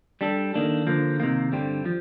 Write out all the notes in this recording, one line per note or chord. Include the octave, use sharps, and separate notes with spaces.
G3 D4 A4
D#3 A#3 D4 A4
D3 F3 A#3
C3 D#3 A#3
G2 D3 G3 C4
F3